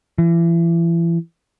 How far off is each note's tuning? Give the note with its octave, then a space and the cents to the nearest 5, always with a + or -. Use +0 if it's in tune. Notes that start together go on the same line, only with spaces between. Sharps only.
E3 +30